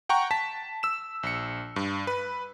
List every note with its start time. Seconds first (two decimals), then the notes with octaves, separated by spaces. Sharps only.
0.09 F#5 G5 A#5 C#6
0.31 A5 B6
0.83 E6 E7
1.23 A#1 C#7
1.76 G2
2.07 B4